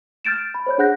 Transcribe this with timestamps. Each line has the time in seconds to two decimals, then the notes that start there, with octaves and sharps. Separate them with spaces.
0.25 F6 G6 A6 D7 E7
0.54 B5
0.66 C5 C#5 G6
0.78 D4 G#4 F#5 F#6 G6 A#6